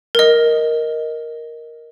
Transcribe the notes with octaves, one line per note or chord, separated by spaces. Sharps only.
A#4 D#5